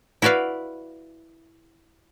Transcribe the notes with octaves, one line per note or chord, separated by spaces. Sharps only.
E4 F#4 B4 D5 F5